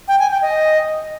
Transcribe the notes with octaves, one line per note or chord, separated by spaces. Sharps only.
G5
G#5
G5
D#5